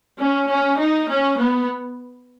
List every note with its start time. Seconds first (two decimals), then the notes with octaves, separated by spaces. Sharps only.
0.19 C#4
0.49 C#4
0.79 D#4
1.09 C#4
1.38 B3